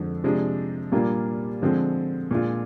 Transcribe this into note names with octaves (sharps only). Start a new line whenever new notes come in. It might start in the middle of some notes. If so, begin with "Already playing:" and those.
Already playing: F2 D3 F3 G#3 D4
C3 F3 G#3 D4
A#2 G3 A#3 D4 F4
D3 F3 G#3 C4
A#2 G#3 D4 F4